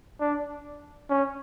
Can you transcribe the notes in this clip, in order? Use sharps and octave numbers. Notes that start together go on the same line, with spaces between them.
D4
C#4